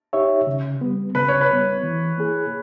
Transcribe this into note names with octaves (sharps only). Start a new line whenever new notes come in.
D#4 G4 C#5 E5
C#3
G3 B3
C#3 B4
C#5
B4
G3 B3
E3
A#3 E4 G#4